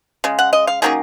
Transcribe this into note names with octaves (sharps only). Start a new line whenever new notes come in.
C#3 G#3
F#5
D#5
F5
D#3 F#3 A#3 C#4 G#4